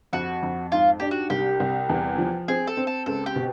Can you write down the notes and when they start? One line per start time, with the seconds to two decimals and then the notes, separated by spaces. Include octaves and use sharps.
0.13 F2 F#4
0.43 F2
0.72 G#2 F4
1.00 D4 G4
1.11 F#4
1.30 C2 G4
1.60 C2
1.89 E2
2.18 F3
2.48 C4 G#4
2.67 A4
2.77 C4
2.87 A4
3.06 C#2 A4
3.26 G4
3.36 B2